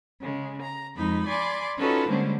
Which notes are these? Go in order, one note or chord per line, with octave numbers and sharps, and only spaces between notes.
C#3 G#3
A#5
F2 G#3 D#4 B5
D5 G#5 B5 C6 D6
C#4 D#4 F4 F#4 A4 B4
D3 G3 G#3 A#3 C4 C#4